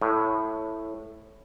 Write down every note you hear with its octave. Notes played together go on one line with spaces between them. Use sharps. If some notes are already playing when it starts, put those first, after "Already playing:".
A2